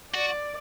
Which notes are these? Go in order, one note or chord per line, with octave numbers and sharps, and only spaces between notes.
F#4 D5